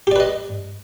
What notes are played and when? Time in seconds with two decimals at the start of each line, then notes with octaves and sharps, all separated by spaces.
0.07 G4
0.11 D5
0.16 B4
0.20 D#5